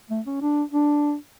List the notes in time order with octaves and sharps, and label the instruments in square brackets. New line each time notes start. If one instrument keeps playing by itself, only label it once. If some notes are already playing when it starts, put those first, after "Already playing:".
[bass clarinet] A3
C#4
D4
D4